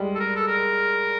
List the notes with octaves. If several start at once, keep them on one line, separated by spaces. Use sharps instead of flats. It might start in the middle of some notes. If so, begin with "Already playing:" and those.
Already playing: G3 G#3
A4
A#4
A4
A#4